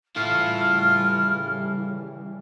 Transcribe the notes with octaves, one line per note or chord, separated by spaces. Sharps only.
C#3 E3 G3 E4 F4 A4 F6